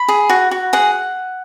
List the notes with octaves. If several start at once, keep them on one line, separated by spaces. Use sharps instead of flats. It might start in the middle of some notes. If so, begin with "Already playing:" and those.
Already playing: B5
G#4
F#4
F#4
G#4 F#5